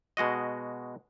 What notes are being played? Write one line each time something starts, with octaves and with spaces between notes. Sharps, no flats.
B2 G#3 F#4 D#5